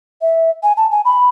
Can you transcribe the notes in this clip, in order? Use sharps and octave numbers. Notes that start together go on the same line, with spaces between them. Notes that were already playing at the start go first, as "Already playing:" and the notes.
E5
G#5
A5
G#5
B5